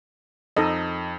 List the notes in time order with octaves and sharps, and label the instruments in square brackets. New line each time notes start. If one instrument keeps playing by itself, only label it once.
[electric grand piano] F2 [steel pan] D#4 A4 D#5